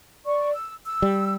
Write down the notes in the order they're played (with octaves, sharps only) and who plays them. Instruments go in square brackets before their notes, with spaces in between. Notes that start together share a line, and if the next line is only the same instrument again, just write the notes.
[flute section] D5 C#6
E6
E6
[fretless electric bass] G3